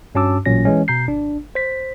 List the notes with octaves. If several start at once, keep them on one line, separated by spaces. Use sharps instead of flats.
G2 C#4 F#4 A5 D6 E6
A1 A#2 F#3 C#4 A#6
E3 G#3 C#4
B2 A#5 G6 C7
G#1 D4
C5 B6